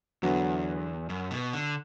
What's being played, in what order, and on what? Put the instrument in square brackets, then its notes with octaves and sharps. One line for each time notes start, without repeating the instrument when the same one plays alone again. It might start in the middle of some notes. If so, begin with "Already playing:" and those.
[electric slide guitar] E2 [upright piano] D3 F#3 B3 F#4
[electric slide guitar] F#2
B2
D3